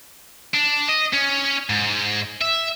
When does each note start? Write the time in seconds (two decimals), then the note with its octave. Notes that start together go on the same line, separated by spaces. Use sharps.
0.54 D4
0.89 D#5
1.13 C#4
1.70 G#2
2.41 E5